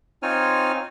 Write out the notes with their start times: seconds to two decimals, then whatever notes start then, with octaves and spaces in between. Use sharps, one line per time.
0.23 C4 D#4 F4 C#5 G#5 F6